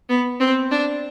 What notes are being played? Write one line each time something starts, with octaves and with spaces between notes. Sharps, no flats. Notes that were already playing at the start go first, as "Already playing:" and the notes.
B3
C4
D4